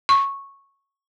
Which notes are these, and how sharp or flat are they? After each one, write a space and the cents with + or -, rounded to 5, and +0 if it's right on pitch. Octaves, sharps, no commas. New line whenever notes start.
C#6 -10